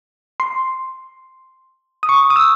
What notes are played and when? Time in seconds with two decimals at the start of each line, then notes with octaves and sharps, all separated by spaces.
0.40 C6
2.03 D#6
2.09 C#6
2.30 D#6
2.36 E6